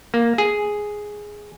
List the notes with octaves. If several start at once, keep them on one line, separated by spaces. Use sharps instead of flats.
A#3
G#4